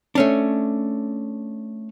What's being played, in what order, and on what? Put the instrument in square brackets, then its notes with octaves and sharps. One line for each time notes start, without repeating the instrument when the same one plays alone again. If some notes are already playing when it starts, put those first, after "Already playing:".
[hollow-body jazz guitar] A3 C#4 D4